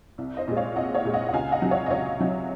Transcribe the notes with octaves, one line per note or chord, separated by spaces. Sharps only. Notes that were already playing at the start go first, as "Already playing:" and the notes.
C2
C5 D#5
A#2 G#3
C#5 F5
C2 D#5 F#5
C#5 F5
A#2 G#3
D#5 F#5
F#5
C#2 F5 G#5
D#5 F#5
C3 F#3
C#5 F5
D#5
C#2 C#5 F5
C3 F#3